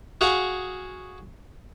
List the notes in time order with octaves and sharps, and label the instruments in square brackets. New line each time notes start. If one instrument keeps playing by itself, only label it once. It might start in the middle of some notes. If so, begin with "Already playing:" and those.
[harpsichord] F#4 G#4 F5